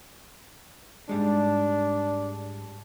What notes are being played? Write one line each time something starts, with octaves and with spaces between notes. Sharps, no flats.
G#2 G3 G#3 D4